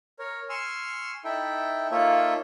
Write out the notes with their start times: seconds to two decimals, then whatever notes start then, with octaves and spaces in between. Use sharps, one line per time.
0.19 A#4 C#5
0.49 G#5 C6 C#6 E6 F6
1.24 D#4 E4 A4 E5 G5
1.91 A#3 D#4 F4 A4 C#5 E5